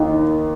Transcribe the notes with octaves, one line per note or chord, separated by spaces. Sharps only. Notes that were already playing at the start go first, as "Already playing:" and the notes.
Already playing: D#2 D#3